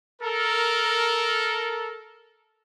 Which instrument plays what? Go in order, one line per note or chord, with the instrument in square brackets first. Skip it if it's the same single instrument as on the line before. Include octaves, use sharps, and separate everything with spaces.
[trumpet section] A4 A#4